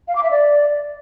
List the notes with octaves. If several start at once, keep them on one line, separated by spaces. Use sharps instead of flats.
F5
D6
E5
D5